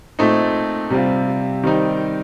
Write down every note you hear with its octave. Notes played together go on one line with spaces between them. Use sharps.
A#2 A3 C4 D#4
C3 G3 C4 F4
D#3 G3 C4 D#4